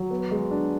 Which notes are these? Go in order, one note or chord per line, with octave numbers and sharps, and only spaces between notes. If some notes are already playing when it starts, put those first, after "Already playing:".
Already playing: F#3
B3
G#3
D4